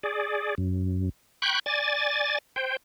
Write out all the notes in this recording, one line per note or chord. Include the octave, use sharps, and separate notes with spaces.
G#4 D5
F#2
G5 B5 C#6 F#6 G6
D5 G#5 A6
C5 G5